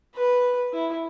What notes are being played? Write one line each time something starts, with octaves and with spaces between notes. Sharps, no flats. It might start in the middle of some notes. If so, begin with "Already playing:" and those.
B4
E4